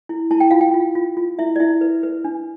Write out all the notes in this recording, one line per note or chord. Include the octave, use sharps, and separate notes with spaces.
E4
E4 A5
G5
F4 F5
G5
F4
F4
F4
E4 E5
D5
E4 E5
B4
B4
D4